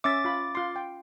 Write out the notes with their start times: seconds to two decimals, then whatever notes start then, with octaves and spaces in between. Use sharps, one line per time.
0.04 C#4 E5 D6 A6
0.25 F4 B5
0.55 F4 C6
0.76 G5